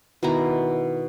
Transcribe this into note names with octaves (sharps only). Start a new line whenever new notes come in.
B2 D#3 E4 A#5